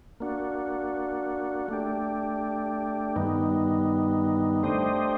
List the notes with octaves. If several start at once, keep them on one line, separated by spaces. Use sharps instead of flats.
A#3 D4 F#4
A3 D4 G4
G2 D#3 G3 B3 D#4
A3 D4 G4 C5 D#5